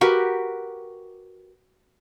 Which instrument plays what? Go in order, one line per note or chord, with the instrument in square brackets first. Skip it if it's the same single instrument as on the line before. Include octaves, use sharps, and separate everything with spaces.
[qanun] F#4 G4 A#4 B4